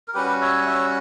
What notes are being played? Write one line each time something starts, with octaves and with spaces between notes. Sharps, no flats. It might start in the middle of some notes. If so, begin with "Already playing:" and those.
A#4
G3 C#4 F#4 G4 B4
C#5 E5
C#5 E5